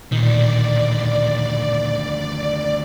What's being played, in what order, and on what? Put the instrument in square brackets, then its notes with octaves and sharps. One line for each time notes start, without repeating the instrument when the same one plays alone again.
[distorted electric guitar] D2 D#3 [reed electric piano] A#2 [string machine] D5